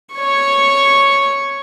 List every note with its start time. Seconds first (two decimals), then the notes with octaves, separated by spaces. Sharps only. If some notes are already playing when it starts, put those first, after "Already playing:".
0.14 C#5 C#6